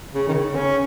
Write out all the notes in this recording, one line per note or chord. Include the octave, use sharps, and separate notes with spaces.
C#3
D#3
C#3
C#4